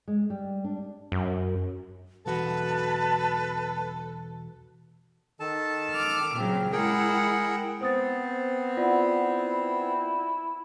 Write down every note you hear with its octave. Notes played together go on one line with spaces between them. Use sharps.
G#3
G3
D4
F#2
B1 E2 F#4 A4 B4 A5
D#3 A4 A5
D6 F6
A#2 C#3 F#3 C4
G#3 E4 G#4 A#4 F#5 G5
B3 C4 C5 D#6 A6
E4 F4 D5 F#5